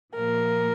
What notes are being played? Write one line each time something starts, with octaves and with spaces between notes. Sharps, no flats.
A#2 F3 A#3 A#4